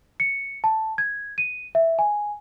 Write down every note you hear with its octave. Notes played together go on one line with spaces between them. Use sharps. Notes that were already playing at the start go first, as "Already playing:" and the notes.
C#7
A5
G#6
D#7
E5
G#5